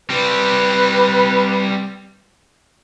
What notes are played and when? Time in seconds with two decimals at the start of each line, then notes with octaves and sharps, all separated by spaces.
0.10 G3 C4 B4